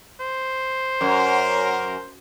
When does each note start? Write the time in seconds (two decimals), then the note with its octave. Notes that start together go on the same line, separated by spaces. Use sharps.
0.20 C5
1.01 F#2 A#4